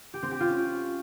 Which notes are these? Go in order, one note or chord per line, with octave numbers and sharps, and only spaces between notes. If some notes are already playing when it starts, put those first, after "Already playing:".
G4
C4
G4
F4
C#4